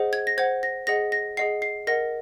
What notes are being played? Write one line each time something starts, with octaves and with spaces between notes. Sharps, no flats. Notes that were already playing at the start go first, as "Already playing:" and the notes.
Already playing: G#4 C5 D#5 F#5
G#6
A#6
C5 F#5 G#6
A#6
G#4 D#5 F#5 A#6
A#6
G#4 D#5 F#5 C7
C7
A#4 D#5 F#5 A#6